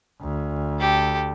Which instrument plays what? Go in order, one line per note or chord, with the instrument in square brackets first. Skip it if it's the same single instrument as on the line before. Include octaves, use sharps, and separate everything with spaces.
[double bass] D2
[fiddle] G4 A4